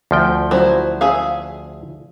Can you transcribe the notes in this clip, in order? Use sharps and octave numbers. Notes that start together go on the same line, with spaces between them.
D2 F3 G5
F#3 E4 C5
G#4 E5 F5